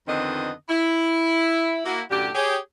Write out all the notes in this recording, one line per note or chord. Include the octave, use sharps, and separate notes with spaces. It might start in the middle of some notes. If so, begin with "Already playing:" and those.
F2 D3 D#3 B3 C4 D#5
E4
A#3 E4 F#4
F#2 A2 D3 G4
G4 G#4 C#5